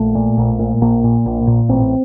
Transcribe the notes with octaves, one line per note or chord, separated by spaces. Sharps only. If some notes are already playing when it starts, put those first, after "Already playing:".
Already playing: A#1 A3
A#2
A#1
A#2
A#1 A#3
A#2
A#1
A#2
A1 C4